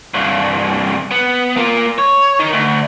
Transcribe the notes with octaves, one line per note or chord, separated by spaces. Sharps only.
C2 G2
B3
A#3 F4
C#5
D#3 D#4
D2